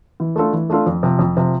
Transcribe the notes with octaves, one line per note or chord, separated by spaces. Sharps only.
E3
A3 D4 F4 A4
E3
A3 D4 F4 A4
F2
C3 F3
F2
C3 F3